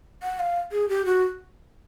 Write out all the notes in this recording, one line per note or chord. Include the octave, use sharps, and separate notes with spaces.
F#5
F5
G#4
G4
F#4